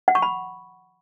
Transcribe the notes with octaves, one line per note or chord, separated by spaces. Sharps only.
F#5
C#6
B5